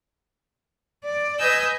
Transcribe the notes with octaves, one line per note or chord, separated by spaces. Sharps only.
D5
B4 D#5 G#5 E6 G6